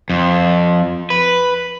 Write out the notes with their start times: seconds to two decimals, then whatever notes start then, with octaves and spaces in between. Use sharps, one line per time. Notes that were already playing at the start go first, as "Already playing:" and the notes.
0.10 F2
1.10 B4